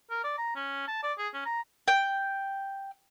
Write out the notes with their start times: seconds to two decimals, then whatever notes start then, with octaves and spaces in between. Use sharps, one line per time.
0.10 A#4
0.24 D5
0.38 A#5
0.55 C#4
0.88 A5
1.03 D5
1.18 G#4
1.34 C#4
1.45 A#5
1.88 G5